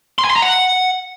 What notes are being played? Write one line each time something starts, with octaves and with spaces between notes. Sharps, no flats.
C6
G#5
C6
A#5
F#5